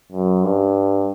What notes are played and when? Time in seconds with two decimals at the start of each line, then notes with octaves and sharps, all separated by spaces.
0.12 F#2
0.44 G2